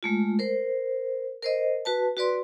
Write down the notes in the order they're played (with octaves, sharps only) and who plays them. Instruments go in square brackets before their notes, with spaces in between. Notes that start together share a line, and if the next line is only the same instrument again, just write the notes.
[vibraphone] G#3 A3 F4
A#4 C5
A#4 C5 D#5
F#4 B4 A5
F#4 B4 D5 C6